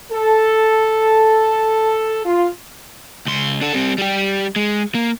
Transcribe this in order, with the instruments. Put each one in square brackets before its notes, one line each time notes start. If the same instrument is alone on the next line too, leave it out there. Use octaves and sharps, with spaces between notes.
[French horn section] A4
F4
[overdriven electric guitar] C#2 C6
D4 A4
G3 C4
G3 G4
G#3
A#3